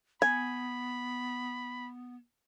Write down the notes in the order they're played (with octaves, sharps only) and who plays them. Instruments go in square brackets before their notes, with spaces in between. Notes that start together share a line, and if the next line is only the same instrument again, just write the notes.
[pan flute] B3 [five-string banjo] G#5 [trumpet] B5